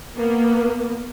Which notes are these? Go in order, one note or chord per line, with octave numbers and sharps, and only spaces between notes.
A#3 B3